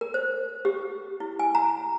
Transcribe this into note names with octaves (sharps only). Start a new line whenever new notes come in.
A#4
C5
G4
E4
G#5
A#5